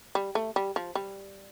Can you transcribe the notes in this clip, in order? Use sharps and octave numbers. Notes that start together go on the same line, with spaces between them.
G3
A3
G3
F3
G3